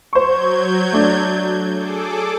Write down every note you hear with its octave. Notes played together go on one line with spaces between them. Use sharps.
F#3 C5 C#6 G6 G#6
A3 D4
G#4 A4 D6